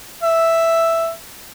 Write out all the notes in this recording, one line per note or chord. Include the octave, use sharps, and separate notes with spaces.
E5